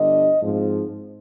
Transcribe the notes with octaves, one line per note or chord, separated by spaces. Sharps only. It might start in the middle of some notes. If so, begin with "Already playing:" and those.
Already playing: G1 G2 D3 D#5
G#2 F3 C4